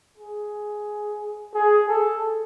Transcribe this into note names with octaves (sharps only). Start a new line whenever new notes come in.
G#4
G#4
A4